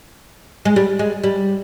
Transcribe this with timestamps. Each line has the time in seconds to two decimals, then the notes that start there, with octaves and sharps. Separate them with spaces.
0.65 G#3
0.76 G3
0.99 G#3
1.24 G3